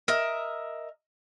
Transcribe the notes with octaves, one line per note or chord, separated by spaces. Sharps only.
A#4 D#5 E5